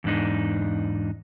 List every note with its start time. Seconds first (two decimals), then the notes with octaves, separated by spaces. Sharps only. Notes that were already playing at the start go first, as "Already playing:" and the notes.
0.04 E2 G#2 D4 D#4